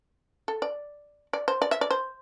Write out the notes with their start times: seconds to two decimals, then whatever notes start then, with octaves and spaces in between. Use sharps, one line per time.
0.48 A4
0.62 D5
1.33 D5
1.48 C5
1.62 D5
1.71 E5
1.81 D5
1.91 C5